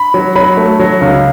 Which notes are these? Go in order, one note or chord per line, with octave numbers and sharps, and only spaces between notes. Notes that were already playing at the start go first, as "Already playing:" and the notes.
Already playing: B5
F#3
F#3 B5
A3
F#3
C#2